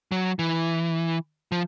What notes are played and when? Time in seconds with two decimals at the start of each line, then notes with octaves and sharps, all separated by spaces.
0.12 F#3
0.39 E3
1.52 F3